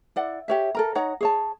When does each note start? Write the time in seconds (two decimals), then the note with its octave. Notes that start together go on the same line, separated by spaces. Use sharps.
0.16 E4 D5 F#5
0.48 G4 C#5 E5
0.75 A4 A#4 A#5
0.95 D#4 C#5 F#5 A#5
1.21 G#4 C#5 A5